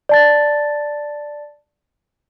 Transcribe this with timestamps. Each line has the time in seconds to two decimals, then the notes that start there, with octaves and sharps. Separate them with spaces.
0.09 D5 A5 A6